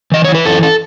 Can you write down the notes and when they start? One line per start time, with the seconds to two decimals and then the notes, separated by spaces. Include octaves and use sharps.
0.12 E3 D#5
0.24 E3 C#5
0.35 B4
0.45 F#2 A4
0.63 A4